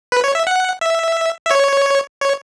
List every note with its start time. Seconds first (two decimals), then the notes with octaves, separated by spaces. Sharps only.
0.12 B4
0.24 C#5
0.35 E5
0.47 F#5
0.81 E5
1.45 E5
1.51 C#5
2.20 C#5